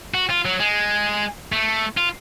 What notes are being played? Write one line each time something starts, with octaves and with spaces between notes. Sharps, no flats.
F#4
F4
F#3
G#3
A3
F4